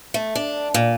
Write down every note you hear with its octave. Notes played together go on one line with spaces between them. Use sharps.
A3
D4
A#2